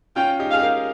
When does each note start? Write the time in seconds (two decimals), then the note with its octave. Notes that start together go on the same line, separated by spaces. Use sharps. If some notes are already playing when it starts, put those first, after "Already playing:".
0.16 C#4 F4 G5
0.40 D#4 G4
0.51 G#4 F5
0.61 G4 A#4